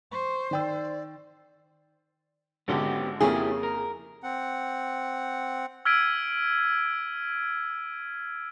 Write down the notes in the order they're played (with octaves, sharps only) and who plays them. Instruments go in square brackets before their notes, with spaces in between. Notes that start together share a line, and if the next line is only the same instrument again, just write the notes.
[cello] C5 [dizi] C#6
[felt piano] D#3 G5 E6 [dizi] D5
[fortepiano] G#1 D3 G#3 [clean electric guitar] B3 C#4 G4
[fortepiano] F2 C#3 A#3 [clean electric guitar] E4 G4 C#5 [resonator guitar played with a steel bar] G#4
[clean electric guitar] A#4
[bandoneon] C4 F#5
[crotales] E6 F6 G#6 B6 D7 D#7